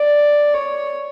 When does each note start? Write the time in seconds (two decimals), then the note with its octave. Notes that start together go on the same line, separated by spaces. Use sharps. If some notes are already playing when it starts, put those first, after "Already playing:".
Already playing: D5
0.54 C#5